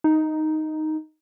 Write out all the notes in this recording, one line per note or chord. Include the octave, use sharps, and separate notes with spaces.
D#4